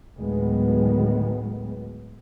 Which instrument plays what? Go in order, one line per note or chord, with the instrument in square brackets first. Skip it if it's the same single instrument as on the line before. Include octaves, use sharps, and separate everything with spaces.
[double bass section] D2 A2 D#3 F#3 G#3 B3